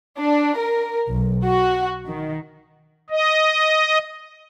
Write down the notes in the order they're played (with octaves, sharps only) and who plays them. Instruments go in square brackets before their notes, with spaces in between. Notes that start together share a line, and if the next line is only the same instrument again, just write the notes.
[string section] D4
A#4
B1
F#4
D#3
[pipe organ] D#5